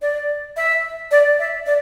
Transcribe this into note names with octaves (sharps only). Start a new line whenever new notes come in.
D5
E5
D5
E5
D5